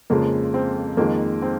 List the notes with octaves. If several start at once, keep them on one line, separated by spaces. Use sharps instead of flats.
F2 C#3 F3 G#3 A#3
C4
F2 D#3 G#3 A#3
C4